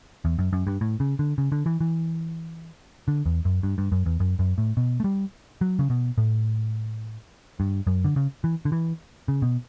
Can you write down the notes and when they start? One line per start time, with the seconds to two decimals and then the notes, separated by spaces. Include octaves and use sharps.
0.25 E2
0.39 F#2
0.53 F#2
0.67 G2
0.81 A2
1.00 C#3
1.19 D3
1.38 C#3
1.52 D3
1.66 E3
1.81 E3
3.08 D3
3.26 E2
3.45 F#2
3.63 G2
3.78 G2
3.92 F#2
4.06 E2
4.20 F#2
4.39 F#2
4.58 A2
4.77 B2
5.00 A3
5.04 G3
5.61 F#3
5.79 C#3
5.90 B2
6.18 A2
7.60 G2
7.87 F#2
8.04 D3
8.16 C#3
8.44 E3
8.65 D3
8.72 E3
9.28 C#3
9.42 B2